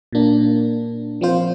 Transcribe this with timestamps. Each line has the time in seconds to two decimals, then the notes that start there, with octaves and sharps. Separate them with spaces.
0.13 A#2 A#3 D4
1.21 F3 C4 F4 C5